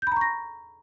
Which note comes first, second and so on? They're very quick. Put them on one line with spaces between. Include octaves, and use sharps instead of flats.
G6 B5 A#5 C#6 A#6